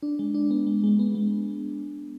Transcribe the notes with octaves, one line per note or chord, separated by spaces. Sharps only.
D4
G#3
D4
B3
G#3
G#3
B3
G#3